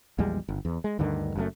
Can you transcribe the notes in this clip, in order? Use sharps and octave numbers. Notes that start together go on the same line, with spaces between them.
A#1 E2 G3 G#3
G1
E2
G#3
D2 G2 D3 D#3
F#1 F#2 A3